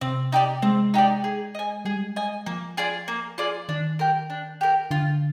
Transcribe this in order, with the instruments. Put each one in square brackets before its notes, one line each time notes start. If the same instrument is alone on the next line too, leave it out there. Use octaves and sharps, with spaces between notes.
[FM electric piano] C3 [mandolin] C4
[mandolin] D#4 G4 D5
[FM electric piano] G#3 [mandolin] C4
[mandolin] D#4 G4 D5
G#4
D#5 G#5
[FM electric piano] G3 [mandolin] G#4
[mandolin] D#5 G#5
[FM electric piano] F3 [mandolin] A#3
[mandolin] F4 G#4 D5
A#3
F4 G#4 D5
[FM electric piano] D#3 [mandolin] D4
[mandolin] G4 A#4
D4
G4 A#4
[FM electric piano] D3 [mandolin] F4